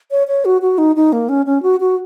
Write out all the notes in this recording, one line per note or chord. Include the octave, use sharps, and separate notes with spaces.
C#5
C#5
F#4
F#4
D#4
D#4
A#3
C#4
C#4
F#4
F#4